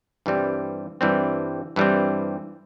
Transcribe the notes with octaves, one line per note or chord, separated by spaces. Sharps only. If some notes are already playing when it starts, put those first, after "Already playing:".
G2 E3 G3 C4
G2 E3 G3 C4
G2 E3 G3 C4